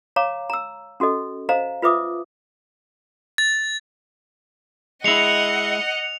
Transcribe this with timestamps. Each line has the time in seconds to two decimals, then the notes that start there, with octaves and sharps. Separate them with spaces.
0.16 C#5 F5 A#5 D6
0.50 A#5 E6
1.00 C#4 F#4 A4 D#5
1.49 C5 D#5 F5 A#5
1.82 F4 B4 E5 D6 D#6
3.38 A6
5.04 G#3 E4 D#5 F#5 C#7 F7